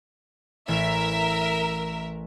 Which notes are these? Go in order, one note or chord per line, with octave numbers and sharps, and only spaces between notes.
A1 A#4 E5 B6